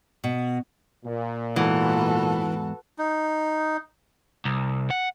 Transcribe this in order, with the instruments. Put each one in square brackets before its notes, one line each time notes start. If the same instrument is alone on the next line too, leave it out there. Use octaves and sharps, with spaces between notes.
[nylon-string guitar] B2
[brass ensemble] A#2
[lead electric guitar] E2 G#2 [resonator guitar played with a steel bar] E3 [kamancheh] F#4 A4
[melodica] D#4
[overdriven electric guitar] C2
F#5